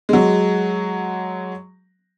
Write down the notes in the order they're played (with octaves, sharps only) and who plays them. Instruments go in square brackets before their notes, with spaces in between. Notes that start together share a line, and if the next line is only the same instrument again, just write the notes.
[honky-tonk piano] F#3 G#3